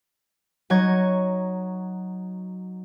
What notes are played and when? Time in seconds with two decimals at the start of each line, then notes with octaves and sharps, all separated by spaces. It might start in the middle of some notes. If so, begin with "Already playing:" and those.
0.70 F#3 D#4 C#6 G#6